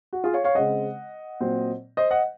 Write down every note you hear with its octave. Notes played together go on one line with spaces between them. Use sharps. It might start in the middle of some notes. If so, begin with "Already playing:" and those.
F#4
F4 G#4
C#5 F5
C#5 F5
C#3 G#3 C4 D#5 F#5
A#2 F#3 C4
C5 D#5
D#5 F#5